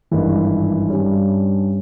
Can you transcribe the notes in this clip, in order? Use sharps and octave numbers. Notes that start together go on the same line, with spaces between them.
G#1 G2 E3
G2 G3 C#4